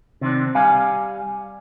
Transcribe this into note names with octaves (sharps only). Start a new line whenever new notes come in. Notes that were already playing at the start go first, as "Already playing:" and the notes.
C3 D#3 C4 D4
G3 F5 G#5